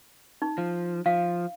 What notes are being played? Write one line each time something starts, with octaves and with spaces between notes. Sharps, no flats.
D#4
F3
F3 F5